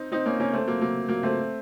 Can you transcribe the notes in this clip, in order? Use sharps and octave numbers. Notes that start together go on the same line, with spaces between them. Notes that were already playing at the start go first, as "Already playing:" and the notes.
Already playing: C4 D#4
C4 D#4
A#3 C#4
A#3 C#4
A3 C4
F#3 A#3
F#3 A#3
F#3 A#3
A3 C4